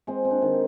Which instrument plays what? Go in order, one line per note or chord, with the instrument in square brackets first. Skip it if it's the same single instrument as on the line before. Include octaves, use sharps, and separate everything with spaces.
[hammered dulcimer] G#3 C4
C4
D4
D#3